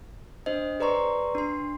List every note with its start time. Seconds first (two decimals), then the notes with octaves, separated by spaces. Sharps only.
0.46 D4 C5 D#5
0.80 G#4 B4 D5 A#5 C6 C#6
1.35 D4 C6